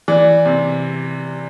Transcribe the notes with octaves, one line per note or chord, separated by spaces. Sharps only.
E3 D5
C3